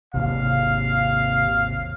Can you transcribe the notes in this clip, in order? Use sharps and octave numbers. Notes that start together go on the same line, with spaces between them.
G#1 D#2 C3 F5